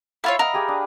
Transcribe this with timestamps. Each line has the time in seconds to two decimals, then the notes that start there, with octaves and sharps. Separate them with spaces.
0.24 E4 F4 C#5 E5 F#5 B5
0.39 A#4 D#5 F5 F#5
0.54 G4 G#4 D#6
0.68 D4